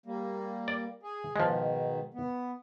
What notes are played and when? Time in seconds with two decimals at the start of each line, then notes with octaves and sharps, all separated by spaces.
0.06 G3 A#3
0.68 D5
1.03 G#4
1.36 G#2 B2 D#3 F3 G#3
2.14 B3